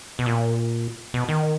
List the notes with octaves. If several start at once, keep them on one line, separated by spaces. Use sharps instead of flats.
B2
A#2
B2
D#3